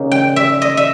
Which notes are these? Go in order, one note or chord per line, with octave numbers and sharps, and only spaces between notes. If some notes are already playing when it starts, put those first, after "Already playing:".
Already playing: C#3 A#3 D#4
G5
E5
D#5
E5